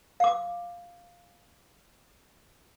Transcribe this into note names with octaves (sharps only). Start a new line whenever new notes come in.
F5 D6